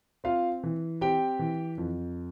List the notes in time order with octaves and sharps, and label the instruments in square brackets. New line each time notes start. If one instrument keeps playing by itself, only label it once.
[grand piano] C4 F4 F5
E3
C4 G4 G5
E3
F2